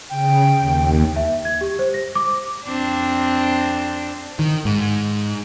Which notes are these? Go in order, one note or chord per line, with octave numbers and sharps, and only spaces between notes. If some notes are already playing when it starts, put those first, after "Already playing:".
C#3 G5
D#2
E5
G#6
G4
C5
A#6
D6
F2 C4 D4
D#3
G#2